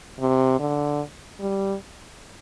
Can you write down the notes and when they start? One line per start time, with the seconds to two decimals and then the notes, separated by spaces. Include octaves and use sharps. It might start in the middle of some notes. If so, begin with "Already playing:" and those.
0.20 C3
0.59 D3
1.40 G3